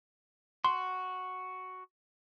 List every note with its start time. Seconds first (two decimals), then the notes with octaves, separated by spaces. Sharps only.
0.64 F#4 C6